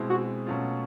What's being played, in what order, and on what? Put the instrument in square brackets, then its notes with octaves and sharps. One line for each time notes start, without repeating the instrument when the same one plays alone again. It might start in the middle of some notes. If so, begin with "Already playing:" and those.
Already playing: [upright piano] B2 G#3 C4 E4
[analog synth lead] F#4
[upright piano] B2 F#3 A3 C#4 F4